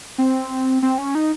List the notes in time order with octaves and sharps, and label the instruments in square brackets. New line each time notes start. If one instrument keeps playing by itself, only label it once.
[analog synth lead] C4
C4
C#4
D#4